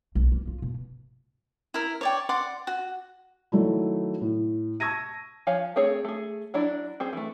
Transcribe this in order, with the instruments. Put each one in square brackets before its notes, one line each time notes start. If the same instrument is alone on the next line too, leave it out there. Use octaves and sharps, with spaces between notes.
[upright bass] B1
A#3
F4
B2
[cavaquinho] E4 A#4
C#5 D5 G5
D5 F#5 C6 D6
F#4
[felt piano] D#3 F#3 A3 E4
A2
A5 C#6 E6 G#6 A#6 D#7
[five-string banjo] F3 C#5 F5 G#5
A3 C4 G#4 C#5
A3 G#4
F#3 D4 E4 D5
C4 G#4 C5
E3 A3